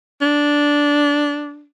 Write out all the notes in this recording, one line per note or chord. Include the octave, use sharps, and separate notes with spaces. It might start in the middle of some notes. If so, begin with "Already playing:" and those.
D4